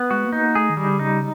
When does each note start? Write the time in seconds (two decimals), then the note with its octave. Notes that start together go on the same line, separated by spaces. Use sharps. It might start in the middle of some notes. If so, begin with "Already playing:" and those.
Already playing: B3
0.10 G#3 F#4
0.25 A#3
0.33 D#4
0.40 A#3
0.55 A3 G#4
0.70 D#3
0.77 G3
0.85 D3
0.99 C#3 D#4